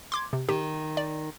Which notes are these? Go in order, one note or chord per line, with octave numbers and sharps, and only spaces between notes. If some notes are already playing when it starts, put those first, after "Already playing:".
C6 D6 G#6
C3
D#3 G4
D5